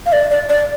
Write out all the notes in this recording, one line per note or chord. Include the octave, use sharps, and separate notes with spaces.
F5
D5
D5
D5